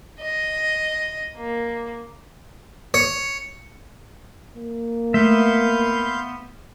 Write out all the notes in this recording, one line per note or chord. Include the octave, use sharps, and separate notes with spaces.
D#5
A#3
C#5
A#3
A3 B3 E5 F5 C6 G6